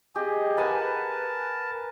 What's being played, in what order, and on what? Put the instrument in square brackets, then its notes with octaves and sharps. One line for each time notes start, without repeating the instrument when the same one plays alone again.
[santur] G4 [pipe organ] G#4 D#5
[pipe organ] A#4 A5 [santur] B4 F#5 G#5